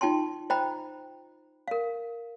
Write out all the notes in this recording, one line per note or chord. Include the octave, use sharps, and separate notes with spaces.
D#4 F4 G5 A5 C6
C5 D#5 G5 A#5 B5
A#4 F5